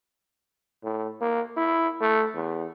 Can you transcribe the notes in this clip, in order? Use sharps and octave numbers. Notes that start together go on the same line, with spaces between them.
A2
A#3
E4
A3
E2